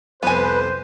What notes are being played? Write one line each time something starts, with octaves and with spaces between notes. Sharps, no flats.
C2 F2 F3 B3 B4 C5 G#5